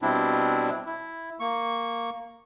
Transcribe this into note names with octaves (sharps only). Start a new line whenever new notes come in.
B2 G3 C4 D4 E4
E4
A#3 C#6